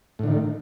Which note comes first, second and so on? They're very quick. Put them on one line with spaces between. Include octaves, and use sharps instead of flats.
A2 D3 D#3